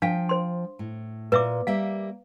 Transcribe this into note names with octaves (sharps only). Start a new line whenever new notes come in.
F3 D4 F5 G5
C5 C6
A2
A#2 B4 E5 D6
G3 A#3 E5 F5